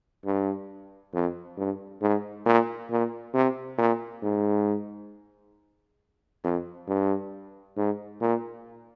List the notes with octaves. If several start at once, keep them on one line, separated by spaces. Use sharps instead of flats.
G2
F2
G2
G#2
A#2
A#2
C3
A#2
G#2
F2
G2
G#2
A#2